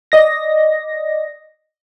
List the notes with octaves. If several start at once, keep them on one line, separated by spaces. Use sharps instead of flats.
D5 D#5 A#6